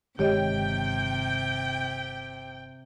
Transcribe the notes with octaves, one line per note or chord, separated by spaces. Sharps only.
G1 C3 D#3 G#3 G4 C#5 D#5 G5